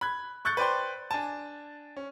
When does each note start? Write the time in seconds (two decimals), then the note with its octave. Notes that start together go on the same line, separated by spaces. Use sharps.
0.01 B5 F#6 G#6
0.45 C#6 F#6 G6 A6 C#7
0.57 B4 C5 D5 G5 C6
1.11 D4 G#5 A5
1.97 C#4